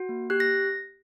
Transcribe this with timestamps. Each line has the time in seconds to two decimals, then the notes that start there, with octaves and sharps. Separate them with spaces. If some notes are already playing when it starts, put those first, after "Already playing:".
Already playing: F#4
0.09 A#3
0.30 G4 F#6
0.40 A#6